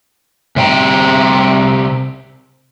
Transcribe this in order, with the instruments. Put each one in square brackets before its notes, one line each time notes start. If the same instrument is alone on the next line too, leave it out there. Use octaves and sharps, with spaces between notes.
[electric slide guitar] C3 G3 C4 G5 A#5